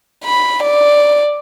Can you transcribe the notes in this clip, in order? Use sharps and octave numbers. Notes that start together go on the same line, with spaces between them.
B5
D5